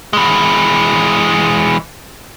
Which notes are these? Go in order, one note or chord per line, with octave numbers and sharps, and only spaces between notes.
E3 G#3